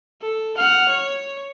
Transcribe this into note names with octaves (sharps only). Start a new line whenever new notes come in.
A4
F#5 F6
C#5